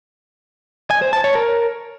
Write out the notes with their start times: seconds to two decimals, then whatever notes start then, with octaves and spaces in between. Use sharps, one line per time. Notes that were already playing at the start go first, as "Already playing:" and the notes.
0.90 G#5
1.02 C5
1.13 A5
1.24 C#5
1.35 A#4